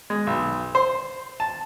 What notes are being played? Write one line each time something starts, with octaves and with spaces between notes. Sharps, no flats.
G#3
B1
C5
A5